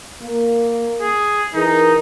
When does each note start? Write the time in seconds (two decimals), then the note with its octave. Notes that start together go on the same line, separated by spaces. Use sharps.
0.22 A#3
1.01 G#4
1.55 E3 D#4 G#4 A#4